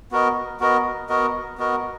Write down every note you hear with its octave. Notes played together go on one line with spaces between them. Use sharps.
B3 F#4 A#4 D#5
B3 F#4 A#4 D#5
B3 F#4 A#4 D#5
B3 F#4 A#4 D#5